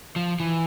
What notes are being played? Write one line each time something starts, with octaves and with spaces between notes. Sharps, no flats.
F3
E3